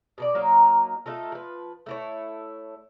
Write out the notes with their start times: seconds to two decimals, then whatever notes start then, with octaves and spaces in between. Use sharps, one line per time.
0.18 B2 A4 D5
0.35 F#3 A#3 D#4 A#4
1.06 A3 D#4 F4 A4
1.32 F3 B4
1.86 A3 E4 C#5